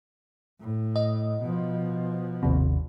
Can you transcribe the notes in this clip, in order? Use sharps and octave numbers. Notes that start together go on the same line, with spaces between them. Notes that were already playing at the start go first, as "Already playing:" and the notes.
A2
D#5
B2 F3
G#1 D#2 C3